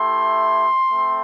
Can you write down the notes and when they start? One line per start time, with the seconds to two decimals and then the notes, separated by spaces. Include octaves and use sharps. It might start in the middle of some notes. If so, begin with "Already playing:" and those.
Already playing: A3 E4 G4 C6
0.91 A3 C4